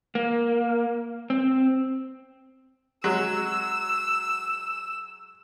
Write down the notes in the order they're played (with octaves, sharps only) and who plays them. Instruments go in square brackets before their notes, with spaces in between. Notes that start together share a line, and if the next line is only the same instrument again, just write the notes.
[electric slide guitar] A#3
C4
[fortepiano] F#3 G#3 [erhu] E6